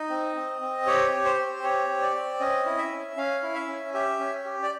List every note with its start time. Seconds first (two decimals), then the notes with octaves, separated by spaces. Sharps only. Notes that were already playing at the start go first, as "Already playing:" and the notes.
Already playing: D#4 D#5
0.10 C4
0.36 C4
0.61 C4
0.87 G4 C#5
1.12 G4
1.25 C5
1.38 C4
1.63 G4 C#5
1.88 C4
2.02 D5
2.15 C4
2.40 C#4 D#5
2.66 E4
2.78 E5
2.92 C#4
3.17 C#4 F5
3.43 E4
3.55 E5
3.68 C#4
3.94 G4 E5
4.19 C#4
4.45 G4
4.63 D5